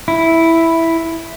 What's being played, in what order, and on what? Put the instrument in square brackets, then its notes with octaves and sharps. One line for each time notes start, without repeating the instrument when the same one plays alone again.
[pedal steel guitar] E4